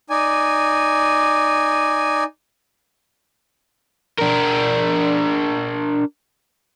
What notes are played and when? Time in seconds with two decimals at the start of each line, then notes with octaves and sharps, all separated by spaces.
0.10 D#4 D5 G#5
4.18 D4 A#4